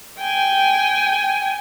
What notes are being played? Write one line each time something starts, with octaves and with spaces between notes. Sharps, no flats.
G5 G#5